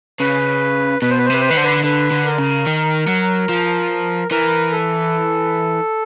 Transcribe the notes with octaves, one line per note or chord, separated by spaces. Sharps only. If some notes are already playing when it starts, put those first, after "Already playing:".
C#3 B4
B2 B4
C5
B4
C5
C3 B4
C5
D#3 B4
D3 C5
B4
D3 B4
D3
A#4
C#3
D#3
F#3
F3
E3 A#4
A4